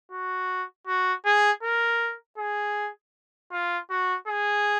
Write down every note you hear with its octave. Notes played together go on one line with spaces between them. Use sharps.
F#4
F#4
G#4
A#4
G#4
F4
F#4
G#4